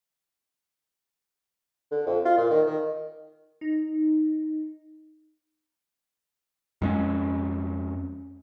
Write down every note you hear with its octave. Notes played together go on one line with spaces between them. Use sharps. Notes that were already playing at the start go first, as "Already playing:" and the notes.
D3
F2
F4
A#2
D#3
D#3
D#4
F2 G#3 C#4